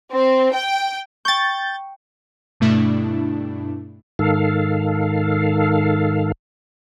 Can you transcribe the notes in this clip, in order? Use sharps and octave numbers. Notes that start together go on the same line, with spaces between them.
C4
G5
G5 C#6 G6 A6
G2 B2 A3 D4 E4
G#2 D#3 A4 F5